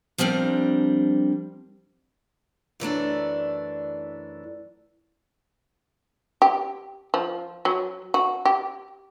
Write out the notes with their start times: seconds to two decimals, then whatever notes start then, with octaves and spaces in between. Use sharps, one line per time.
0.18 F3 G3 C4 D4 A#4
2.80 F#2 E3 A3 D4
6.42 G4
7.14 F3
7.65 F#3
8.14 F#4
8.45 G4